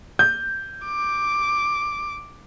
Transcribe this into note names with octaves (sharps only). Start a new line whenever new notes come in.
G6
D6